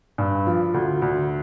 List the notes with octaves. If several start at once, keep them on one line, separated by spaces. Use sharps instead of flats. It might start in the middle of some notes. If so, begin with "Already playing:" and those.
G2
F3
D2
D2